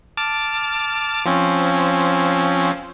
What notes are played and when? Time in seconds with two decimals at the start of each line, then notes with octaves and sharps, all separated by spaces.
0.17 A5 D6 F6
1.25 F3 C4 C#4